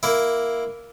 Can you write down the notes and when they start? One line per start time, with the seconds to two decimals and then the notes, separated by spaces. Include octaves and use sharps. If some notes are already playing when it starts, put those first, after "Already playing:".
0.03 A#3 E4